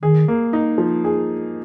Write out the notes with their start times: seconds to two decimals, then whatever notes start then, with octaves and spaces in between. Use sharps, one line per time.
0.02 D#3 G#4
0.28 A#3
0.53 D#4
0.78 F3
1.04 G#4